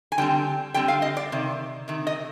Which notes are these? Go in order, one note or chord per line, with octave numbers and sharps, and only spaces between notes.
G#5
D3 G3 C4 G5
D3 G3 C4 G5
F5
D#5
D5
C3 D#3
C3 D#3
D#5